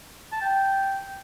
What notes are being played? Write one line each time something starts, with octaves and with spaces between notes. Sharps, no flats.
A5
G5